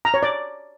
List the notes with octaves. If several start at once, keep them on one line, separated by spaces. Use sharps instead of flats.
A#5
C#5
D5